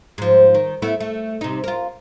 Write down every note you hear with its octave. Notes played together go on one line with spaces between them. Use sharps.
G#2 F3
D#3
A3 B3 E4
A3
C3 D#4
F4 A#4